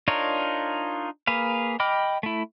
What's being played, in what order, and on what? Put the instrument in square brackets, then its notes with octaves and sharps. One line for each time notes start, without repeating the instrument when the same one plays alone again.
[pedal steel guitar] D4 D#4 F4 A#4 C#5
A#3 G#4 B4 F5
D#5 G5 B5 D6 F6
A3 E4